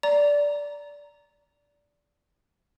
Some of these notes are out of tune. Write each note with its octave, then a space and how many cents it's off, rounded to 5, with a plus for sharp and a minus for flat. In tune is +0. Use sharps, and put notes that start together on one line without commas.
D5 -10 A#5 +0